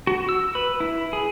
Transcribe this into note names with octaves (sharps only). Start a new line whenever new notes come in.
F#4
E6
B4
E4
G#4